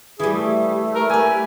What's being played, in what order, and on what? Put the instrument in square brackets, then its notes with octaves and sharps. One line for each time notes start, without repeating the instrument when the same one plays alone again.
[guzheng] E3 G3 [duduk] G#4
[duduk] A3
[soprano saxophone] A#4
[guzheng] G4 B4 [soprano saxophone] G#5